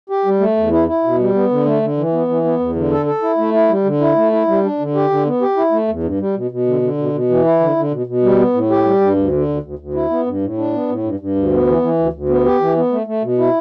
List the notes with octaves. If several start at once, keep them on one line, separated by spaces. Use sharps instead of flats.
G4
G3
A3
E2
E4
E4
B2
G3
B3
D3
A3
D3
E3
B3
E3
B3
E2
D3
A4
A4
E4
A3
E4
G3
D3
E4
A3
E4
G3
D4
D3
G4
D3
B3
G4
E4
A3
E2
G2
G3
B2
B2
D3
D3
B2
B2
E3
E4
D3
D3
B2
B2
G3
B3
A2
G4
G3
G2
D2
D3
D2
D2
D2
E4
B3
G2
A2
D4
B3
A2
G2
G2
D2
B3
E3
E3
D2
D2
B3
G4
E3
B3
A3
A3
B2
E4